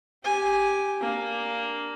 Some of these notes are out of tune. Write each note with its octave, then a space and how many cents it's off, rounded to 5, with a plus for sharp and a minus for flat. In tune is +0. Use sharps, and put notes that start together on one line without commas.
G4 +0 G#5 +0
A#3 +0 D4 -5